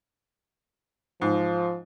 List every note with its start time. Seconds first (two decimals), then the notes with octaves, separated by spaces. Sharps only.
1.21 G#2 F3